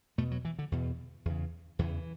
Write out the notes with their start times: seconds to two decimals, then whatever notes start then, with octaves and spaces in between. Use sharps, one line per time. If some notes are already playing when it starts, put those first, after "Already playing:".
0.18 E2 B2 A3
0.31 F#3
0.45 E3
0.59 D3
0.72 E2 B2
1.25 E2 C#3
1.79 E2 C#3 E3